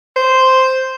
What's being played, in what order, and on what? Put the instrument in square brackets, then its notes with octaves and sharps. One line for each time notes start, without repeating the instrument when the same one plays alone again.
[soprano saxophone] C5